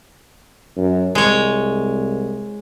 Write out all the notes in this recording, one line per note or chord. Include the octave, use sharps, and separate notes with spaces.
F#2
C2 G#3 C#5